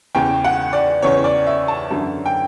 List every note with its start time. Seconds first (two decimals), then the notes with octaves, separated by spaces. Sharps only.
0.15 E2 C#3 E3 G5
0.44 F#5
0.73 D5
1.02 E2 C#3 E3 C#5
1.24 D5
1.47 E5
1.68 A5
1.91 F#2 D3
2.26 G5